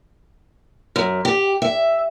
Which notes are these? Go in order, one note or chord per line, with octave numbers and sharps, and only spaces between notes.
F#2
G4
E5